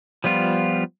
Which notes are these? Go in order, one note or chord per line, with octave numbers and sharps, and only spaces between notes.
F3 G3 B3 F4